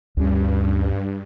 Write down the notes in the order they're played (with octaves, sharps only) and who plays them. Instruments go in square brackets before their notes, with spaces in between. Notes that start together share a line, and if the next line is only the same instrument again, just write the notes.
[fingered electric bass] D2 C#4 [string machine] G2